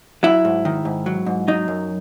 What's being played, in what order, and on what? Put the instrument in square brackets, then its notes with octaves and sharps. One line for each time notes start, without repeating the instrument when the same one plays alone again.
[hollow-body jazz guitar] F#3 E4
G#2
D#3
G#2
F#3
G#2
F#3 D#4
F#2